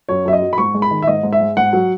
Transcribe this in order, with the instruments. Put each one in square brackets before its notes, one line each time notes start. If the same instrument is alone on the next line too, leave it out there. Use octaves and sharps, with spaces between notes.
[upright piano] F#2 C#5
F#2 E5
D#5
F#3
B5
G#2 C#6
G#3
B5
D#3
E5
G#2 D#5
G#2
E5
G#3
G#2 F#5
F#3